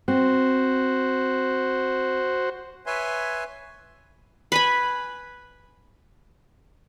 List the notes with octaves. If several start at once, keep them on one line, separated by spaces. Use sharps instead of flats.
C4 F#4 C5
B4 C#5 E5 G#5 C6
B4 G#5 B5